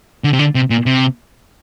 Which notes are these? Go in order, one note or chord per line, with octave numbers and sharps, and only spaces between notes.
D3
C3
D3
C3
A#2
C3